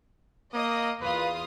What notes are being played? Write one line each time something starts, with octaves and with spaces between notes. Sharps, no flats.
A#3 D#5 D#6
E2 F4 B4 D#6